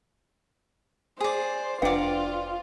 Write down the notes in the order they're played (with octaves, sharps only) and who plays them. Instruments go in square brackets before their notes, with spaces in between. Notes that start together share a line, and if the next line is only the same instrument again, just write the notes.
[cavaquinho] G#4 D5 [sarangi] C5
[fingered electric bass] F1 D4 [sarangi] F4 [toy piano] B4 F#5 G5 [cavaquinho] D5 A#5